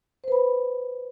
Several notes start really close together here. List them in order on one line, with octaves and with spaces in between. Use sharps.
C5 B4 B5